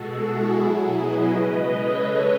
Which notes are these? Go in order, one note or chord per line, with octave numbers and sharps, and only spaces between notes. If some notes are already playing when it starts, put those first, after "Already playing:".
Already playing: B2 G#3 F#4 A4
E4 G#4
B2 F#3
B4 D#5
C#3 G#3 B4 D#5
A4 C#5